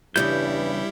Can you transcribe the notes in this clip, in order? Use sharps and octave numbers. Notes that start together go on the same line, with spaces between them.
E2 G2 A#2 C#3 G3 E4 G6